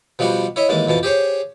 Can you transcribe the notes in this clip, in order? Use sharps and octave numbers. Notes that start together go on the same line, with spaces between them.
B2 F3 G3 B3 F#4
E4 C#5 D#5 E5
D#2 E3 G#3 A5
F2 B2 E3 A5
G4 G#4 C5 C#5